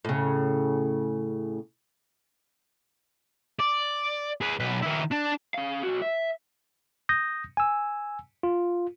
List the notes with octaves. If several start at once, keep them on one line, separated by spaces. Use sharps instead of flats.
A2 C#3
D5
G#4 B4
B1 B4
D#3 E4
D4
C#4 F5
B1 F#4
E5
D#6 G6 A#6
G#5 E6
F4